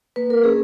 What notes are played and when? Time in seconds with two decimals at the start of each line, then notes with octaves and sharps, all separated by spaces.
0.16 A#3 B4
0.30 A#4
0.44 C#4 G#4